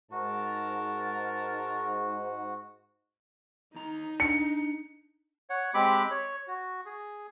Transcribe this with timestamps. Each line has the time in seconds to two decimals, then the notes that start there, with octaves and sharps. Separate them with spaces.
0.11 G#2 F#4 A#4 A5
3.75 D#2 D#4 A#5
4.20 D4 C#7
5.50 C#5 F#5
5.74 G#3 C4 G4 B5 D6
6.11 C#5
6.47 F#4
6.86 G#4